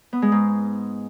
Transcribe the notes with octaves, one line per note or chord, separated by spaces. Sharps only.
B3
G#3
G#2